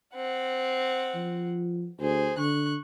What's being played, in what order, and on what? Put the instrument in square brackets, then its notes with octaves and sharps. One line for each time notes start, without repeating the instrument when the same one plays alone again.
[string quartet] C4 F#5
[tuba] F3
[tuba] D2 [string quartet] G#4 C5
[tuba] D3 [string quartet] C#6 F#6